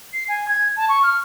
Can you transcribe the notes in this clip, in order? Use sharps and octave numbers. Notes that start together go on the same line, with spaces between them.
C7
G#5
G#6
A5
C#6
F6